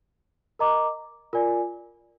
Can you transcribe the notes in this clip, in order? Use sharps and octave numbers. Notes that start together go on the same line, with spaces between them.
A#4 D#5 A#5 D6
F4 A#4 D5 G#5